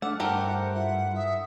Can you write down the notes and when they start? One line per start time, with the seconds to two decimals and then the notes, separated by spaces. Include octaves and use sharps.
0.02 A3 D4 F#5 D6 F6
0.20 G2 A3 G4 A#4 C5 F#5
0.73 E4 F4 E5 F#5
1.15 E5 D#6